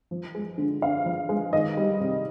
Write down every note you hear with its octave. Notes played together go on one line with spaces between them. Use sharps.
F3
G#3
D3
D3 F5
F3
G#3
D#3 D#5
G3
C3